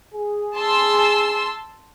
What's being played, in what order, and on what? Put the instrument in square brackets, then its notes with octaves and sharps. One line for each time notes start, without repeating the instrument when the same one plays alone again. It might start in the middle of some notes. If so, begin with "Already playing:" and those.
[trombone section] G#4
[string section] A5 C6 E6